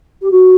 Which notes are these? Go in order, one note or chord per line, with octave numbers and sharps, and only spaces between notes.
G4
F#4